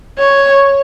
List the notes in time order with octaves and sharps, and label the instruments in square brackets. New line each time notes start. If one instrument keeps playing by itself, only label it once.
[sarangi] C#5